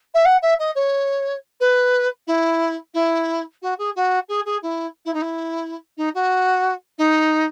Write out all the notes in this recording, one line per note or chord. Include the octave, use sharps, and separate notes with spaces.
E5
F#5
E5
D#5
C#5
B4
E4
E4
F#4
G#4
F#4
G#4
G#4
E4
E4
D#4
E4
D#4
F#4
D#4